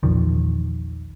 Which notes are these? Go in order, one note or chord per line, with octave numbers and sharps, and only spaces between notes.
A#1 E2 D#3 F3